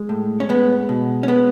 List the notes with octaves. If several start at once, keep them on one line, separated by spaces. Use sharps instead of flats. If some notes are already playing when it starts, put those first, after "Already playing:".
Already playing: G#3
A2
C#4
G#3 B3
B2
C#4
G#3 B3